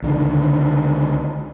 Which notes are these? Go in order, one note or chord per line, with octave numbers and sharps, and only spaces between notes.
C#2 D3 D#3